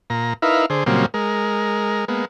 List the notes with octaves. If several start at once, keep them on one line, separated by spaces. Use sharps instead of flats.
A#2 A#5
D#4 E4 A#4 B4 E5 F5
D3 G#4 C5
A#2 C#3 F#3 G3 A#3 C4
G#3 A#4
G#3 A#3 B3